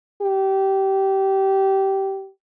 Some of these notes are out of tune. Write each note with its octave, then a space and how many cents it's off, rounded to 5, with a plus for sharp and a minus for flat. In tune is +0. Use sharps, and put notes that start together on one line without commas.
G4 -20